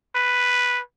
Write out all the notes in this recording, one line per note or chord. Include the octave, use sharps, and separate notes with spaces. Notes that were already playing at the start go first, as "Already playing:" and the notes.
B4